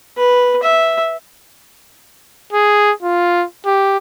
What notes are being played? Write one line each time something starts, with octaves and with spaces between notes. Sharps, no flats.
B4
E5
G#4
F4
G4